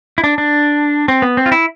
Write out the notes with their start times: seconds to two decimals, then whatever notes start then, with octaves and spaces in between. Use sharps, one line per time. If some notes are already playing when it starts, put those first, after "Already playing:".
0.18 E4
0.24 D4
0.38 D4
1.08 C4
1.22 B3
1.37 C4
1.46 F4
1.52 E4